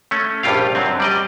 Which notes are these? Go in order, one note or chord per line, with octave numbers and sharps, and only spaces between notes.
A3 C#4
A#1 G2 G3 F4 G4 F5
F#2 F#3 C4
G3 D5 D#5